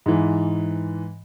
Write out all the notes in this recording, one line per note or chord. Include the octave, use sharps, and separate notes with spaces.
G#2 E3